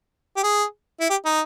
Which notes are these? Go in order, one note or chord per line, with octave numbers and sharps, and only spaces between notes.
G4
G#4
E4
G4
D#4